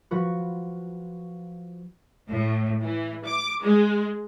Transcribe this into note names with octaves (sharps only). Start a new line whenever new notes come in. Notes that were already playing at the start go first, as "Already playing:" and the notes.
F3 F#4 B4
A2
E3
D6
G#3